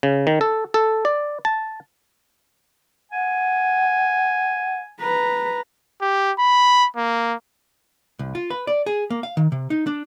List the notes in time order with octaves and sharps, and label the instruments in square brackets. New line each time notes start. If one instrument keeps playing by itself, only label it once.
[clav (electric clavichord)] C#3
D#3
A4
A4
D5
A5
[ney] F#5 [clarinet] G#5
[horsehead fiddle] B4 A#5
[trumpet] G4
B5
A#3
[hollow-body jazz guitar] C2
F4
B4
D5
G#4
A#3
F5
D#3
C3
D#4
D4